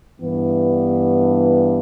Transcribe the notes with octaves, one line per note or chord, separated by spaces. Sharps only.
G2 E3 B3